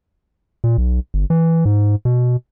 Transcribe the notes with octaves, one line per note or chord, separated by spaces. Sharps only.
A#2
B1
G1
E3
G#2
B2